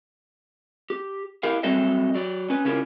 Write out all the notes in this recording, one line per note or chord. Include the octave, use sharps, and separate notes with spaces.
G4
E4 G4 A#4 F5
F#3 G3 C4 A4 D#5 E5
F#3 D5
C#4 B4
C#3 C#4 E4 F4 G4 A#4